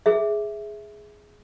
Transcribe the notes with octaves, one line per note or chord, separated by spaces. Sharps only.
G#4 E5